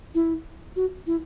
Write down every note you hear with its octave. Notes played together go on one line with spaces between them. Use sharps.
E4
F#4
E4